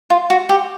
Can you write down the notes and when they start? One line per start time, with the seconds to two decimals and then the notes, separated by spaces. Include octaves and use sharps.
0.10 F4
0.30 F#4
0.49 G4